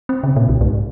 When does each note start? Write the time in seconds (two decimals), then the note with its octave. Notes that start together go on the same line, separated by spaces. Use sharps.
0.09 C4
0.24 C#3
0.36 A#2
0.49 C2
0.61 G#2